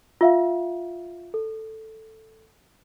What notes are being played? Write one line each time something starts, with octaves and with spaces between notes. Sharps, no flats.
F4 E5 F5
A4